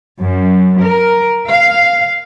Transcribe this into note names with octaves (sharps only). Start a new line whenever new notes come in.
F#2
A#4
F5